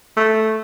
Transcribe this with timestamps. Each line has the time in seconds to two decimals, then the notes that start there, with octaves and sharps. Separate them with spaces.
0.17 A3